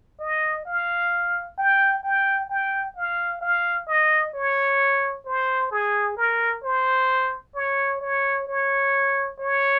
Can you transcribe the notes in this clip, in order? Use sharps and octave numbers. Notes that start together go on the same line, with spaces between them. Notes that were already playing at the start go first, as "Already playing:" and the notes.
D#5
F5
G5
G5
G5
F5
F5
D#5
C#5
C5
G#4
A#4
C5
C#5
C#5
C#5
C#5